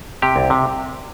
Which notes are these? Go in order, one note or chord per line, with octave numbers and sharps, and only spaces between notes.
C3 G4
C2
C3